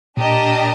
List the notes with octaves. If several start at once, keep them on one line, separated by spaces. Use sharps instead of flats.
A#2 D4 G4 A#4 D#5 A5